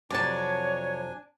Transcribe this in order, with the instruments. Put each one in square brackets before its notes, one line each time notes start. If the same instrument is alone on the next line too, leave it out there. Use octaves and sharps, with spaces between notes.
[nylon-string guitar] F2 C3 F#3 [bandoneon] D4 G#5 [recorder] C#5 [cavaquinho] D5 A5